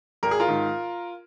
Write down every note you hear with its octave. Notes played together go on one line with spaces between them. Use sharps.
G#1 A#4
G#4
F4 A#4
G#2 D#3